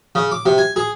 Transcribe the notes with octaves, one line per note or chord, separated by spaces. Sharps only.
C#3
D6
C3
G#5
G#4